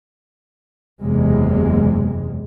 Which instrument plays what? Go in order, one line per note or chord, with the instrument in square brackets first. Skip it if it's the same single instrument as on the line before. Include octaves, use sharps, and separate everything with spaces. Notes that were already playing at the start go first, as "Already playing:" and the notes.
[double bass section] F#1 E2 C3 G#3